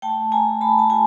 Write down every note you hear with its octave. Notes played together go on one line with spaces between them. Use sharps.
A3 G5 A5
A3 G#5 A#5
A3 A5 B5
A5
F#4 G#5 A#5